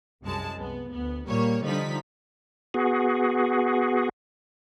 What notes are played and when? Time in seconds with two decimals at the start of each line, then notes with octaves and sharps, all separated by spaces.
0.24 C2 F#2 G#3 A5
0.57 C2 B3
0.93 D2 B3
1.28 A#2 G3 A#3 C#5
1.64 D3 F3 G3 D#4 B6
2.74 B3 F#4 G#4